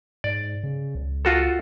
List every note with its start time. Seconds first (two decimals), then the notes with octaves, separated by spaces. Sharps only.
0.24 G#2 D5
0.63 C#3
0.95 C#2
1.25 F4 F#4 A4